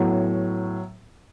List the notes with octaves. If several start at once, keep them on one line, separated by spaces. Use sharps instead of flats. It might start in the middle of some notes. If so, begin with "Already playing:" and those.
Already playing: A2 F#3 B3